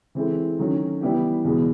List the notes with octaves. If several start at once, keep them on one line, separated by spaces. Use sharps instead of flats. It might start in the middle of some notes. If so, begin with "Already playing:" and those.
E3 G#3 C4 E4 A4
D#3 F#3 A3 C#4 F#4
E3 G3 B3 E4 G4
E2 B2 G#3